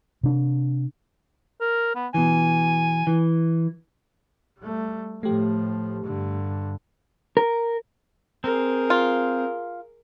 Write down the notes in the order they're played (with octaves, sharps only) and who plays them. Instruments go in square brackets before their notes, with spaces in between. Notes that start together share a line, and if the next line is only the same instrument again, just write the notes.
[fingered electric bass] C3 D4
[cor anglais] A#4
B3
[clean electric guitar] B2 E3 [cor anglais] G#5
[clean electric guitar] E3
[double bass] G3 A3
[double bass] A2 F3 [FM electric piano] A3 G4
[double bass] G2 D3
[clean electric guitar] A#4
[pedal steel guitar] C4 [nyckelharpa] G#4 A#4
[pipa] F4